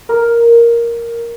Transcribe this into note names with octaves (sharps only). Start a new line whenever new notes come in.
A#4